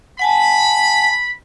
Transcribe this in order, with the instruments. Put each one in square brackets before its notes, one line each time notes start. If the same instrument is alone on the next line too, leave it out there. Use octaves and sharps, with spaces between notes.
[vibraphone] F#5 G#5 A5 [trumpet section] B5